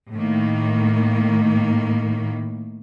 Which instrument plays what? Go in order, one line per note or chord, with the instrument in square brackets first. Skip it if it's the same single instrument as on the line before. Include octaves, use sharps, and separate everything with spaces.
[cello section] A2 D#3 A#3